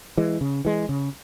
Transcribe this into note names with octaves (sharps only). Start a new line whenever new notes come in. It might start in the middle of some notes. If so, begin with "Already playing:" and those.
E3 G#3
C#3
E3 G#3
C#3